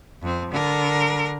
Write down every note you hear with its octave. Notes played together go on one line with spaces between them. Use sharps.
F2 C4
D3 A#4